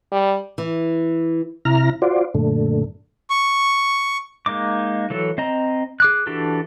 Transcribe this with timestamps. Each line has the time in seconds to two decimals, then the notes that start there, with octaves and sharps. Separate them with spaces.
0.12 G3
0.58 E3
1.65 C3 E4 A#5 F6
2.02 F4 F#4 C5 D5
2.34 F#2 A#2 D3 A3
3.30 C#6
4.46 G#3 A#3 D#4 D6
5.10 E3 F#3 A4
5.38 C4 D#5 A#5
6.00 G#4 D6 F#6
6.27 E3 D4 F#4 G4 A4